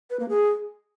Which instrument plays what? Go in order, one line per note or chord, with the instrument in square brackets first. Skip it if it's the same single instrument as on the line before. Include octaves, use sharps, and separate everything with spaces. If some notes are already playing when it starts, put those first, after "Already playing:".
[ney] B4
A#3
G#4